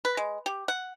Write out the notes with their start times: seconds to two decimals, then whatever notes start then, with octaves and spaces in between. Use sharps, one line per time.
0.05 B4
0.17 G#3
0.46 G4
0.68 F#5